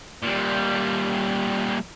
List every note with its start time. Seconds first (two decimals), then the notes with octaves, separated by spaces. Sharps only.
0.23 A#2 G3